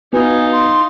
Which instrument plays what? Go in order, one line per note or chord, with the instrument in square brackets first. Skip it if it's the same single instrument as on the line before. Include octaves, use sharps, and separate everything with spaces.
[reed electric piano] B3 F#4 B4 [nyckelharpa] D#4 F4 [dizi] G#5
[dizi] C6